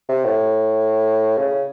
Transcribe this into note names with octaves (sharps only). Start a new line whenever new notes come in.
C3
A2
C#3